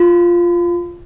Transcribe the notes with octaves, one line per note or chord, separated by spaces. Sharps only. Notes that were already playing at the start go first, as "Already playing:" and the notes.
Already playing: F4